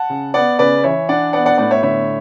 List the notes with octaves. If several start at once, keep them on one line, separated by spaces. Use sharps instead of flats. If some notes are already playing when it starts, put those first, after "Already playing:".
Already playing: F#5 A5
C#3
B3 D5 F#5
C#3 B4 D5
E3 C#5 E5
D4 D5 F#5
B3 D5 F#5
D5 F#5
A2 D5 F#5
C#5 E5
D3 C#5 E5